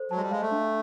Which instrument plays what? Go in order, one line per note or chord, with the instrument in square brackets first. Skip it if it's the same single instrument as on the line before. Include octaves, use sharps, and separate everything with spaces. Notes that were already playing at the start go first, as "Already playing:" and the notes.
Already playing: [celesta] A4 C5
[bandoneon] F#3 [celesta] A5
[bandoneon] G#3
G3
[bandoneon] G#3 [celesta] F5
[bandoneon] A3
[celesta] D4